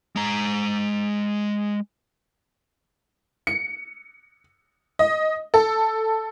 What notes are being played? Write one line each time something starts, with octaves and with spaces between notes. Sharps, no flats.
G#3 A#5
C#7
D#5
A4